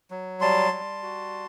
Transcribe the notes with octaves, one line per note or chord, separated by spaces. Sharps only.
F#3
G3 A5 C6
G3
F#4